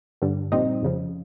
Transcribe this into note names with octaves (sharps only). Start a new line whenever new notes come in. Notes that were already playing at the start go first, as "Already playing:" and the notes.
G2 D3 G3
A#1 A#2 G3 C4 D#4
F2 C#3 F3